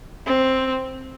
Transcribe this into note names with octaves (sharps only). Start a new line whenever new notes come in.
C4